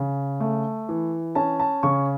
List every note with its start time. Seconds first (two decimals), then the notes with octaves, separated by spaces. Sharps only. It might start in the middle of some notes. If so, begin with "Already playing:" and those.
Already playing: C#3
0.40 A3
0.89 E3
1.35 C#4 A5
1.60 A5
1.83 C#3 C#6